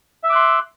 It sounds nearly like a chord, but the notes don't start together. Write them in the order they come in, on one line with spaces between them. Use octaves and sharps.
E5 E6 D6 F#6 C6